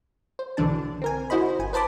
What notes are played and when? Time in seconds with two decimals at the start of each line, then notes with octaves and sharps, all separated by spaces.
0.39 C5
0.57 B1 D3 E3 D4 A5
1.02 C4 A#4 G#5
1.30 E4 F#4 C5 D#5 B5
1.59 G1 G#5
1.73 B4 C5 A5 B5 D6